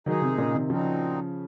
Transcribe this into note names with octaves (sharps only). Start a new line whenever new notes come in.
D#3 F#3 G#3 D#4 G#4
C3 D#3
A#2 C#3
C3 D#3
A#2 C#3 F3 F#3 C4 D#4